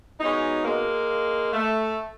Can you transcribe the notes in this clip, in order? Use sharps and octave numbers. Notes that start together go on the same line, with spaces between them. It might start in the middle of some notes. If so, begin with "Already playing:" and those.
B2 G#3 C#4 D#4
G#3 A#3
A3